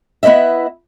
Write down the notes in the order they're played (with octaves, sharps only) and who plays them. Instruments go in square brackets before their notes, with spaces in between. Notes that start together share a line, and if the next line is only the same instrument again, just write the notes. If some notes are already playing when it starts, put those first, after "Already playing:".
[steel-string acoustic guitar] B3 E4 B4 D#5 E5